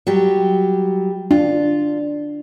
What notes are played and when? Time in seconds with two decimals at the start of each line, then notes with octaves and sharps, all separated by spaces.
0.07 F#3 G3 G4
1.31 D4 F4